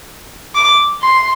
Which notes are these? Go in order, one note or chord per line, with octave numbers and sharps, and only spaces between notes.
D6
C6